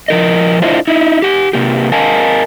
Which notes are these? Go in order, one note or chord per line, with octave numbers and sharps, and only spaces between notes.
F3 A#4 D#5
D4 E4 F4 C5 D#5 E5
D#4 E4
G4 F#5
C3 A#3 G4
A#4 D#5 F5 G#5 A5